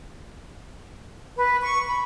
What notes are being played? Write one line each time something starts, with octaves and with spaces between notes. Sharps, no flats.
B4
C#6
B5